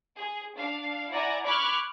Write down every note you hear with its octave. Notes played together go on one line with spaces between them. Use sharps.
G#4
D4 F5
E4 D5 F#5 G#5 A#5
B5 C#6 D6 F6 F#6 G#6